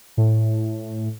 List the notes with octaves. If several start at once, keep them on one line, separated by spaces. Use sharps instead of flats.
A2